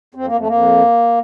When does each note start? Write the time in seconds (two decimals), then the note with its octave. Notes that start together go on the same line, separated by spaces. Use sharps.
0.15 F2 C4
0.26 A#3
0.32 F2 A3
0.47 F2 A#3